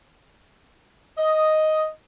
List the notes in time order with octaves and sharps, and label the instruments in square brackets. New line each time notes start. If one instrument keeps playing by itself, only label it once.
[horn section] D#5